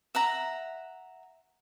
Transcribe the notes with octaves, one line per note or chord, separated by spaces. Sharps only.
E5 F#5 A#5